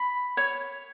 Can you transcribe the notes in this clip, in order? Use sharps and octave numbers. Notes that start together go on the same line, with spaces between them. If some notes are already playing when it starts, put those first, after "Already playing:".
Already playing: B5
C#5